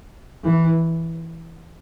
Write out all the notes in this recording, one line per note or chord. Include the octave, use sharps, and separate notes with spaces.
E3